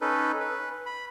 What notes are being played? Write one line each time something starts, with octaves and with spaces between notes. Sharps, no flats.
C#4 D#4 A4 B4
B4
B5